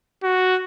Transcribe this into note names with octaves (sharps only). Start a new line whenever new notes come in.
F#4